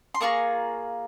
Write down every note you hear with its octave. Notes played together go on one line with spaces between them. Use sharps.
C6
A#3 F4 G#4 A#5 C#6